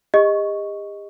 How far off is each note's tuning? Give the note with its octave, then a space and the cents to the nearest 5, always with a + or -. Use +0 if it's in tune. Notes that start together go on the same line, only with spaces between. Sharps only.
G4 +45 D#5 +0 C#6 +0